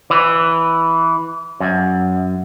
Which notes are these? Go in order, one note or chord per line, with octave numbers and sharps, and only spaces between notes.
E3
F#2